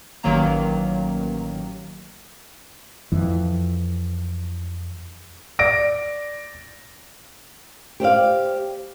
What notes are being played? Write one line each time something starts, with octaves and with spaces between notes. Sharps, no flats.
A1 D#3 F#3 A#3 A#5
F2 E3
D5 A#6 D7
G4 C5 D5 F5